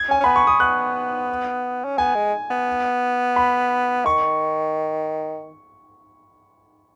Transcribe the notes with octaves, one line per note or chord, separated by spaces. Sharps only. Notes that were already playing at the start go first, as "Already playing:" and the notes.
Already playing: G#6
C#4 G#5
C#4
B3 B5
C#6
D#6
B3 F#6
C#4
B3 G#5
G#3
B3
B5
D#3 C#6